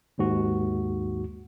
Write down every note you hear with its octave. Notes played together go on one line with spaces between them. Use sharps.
G#1 D#2 G#2 F#4